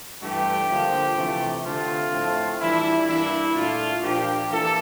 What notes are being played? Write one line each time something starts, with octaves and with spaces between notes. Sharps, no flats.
G2 E3 A3 D4 G4
D3 F3 A#3
C3 E3 A3
D3 A3 C4 F4
A2 F3 A3 C4
E3 G3 D4 E4
G2 E3 A#3 D4 E4
A#2 A3 D4 F4
A#2 F3 A#3 D4 G4
E3 A#3 A4